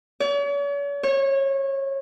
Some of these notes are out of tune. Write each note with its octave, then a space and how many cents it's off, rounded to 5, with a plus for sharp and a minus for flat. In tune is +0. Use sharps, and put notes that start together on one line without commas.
C#5 +45
C#5 -25